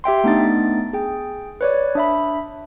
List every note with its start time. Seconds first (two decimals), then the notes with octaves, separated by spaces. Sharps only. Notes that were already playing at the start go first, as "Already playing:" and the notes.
0.04 G4 E5 G5 C6
0.24 A3 B3 D4 D#4 A6
0.93 G#4 G5
1.61 B4 C#5 D5
1.95 D4 E5 B5